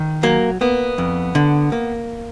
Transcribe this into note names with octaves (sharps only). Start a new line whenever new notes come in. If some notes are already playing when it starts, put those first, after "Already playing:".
Already playing: D#3
F#3 A#3
A#3 B3
F2
D3
A#3